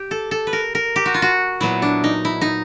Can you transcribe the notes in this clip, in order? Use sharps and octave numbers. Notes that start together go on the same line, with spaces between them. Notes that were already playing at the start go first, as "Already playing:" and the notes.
Already playing: G4
A4
A4
B4
A#4
A#4
G4
F#4
F4
F#4
A#2 F#3 B3 E4
D4
D#4
E4
D#4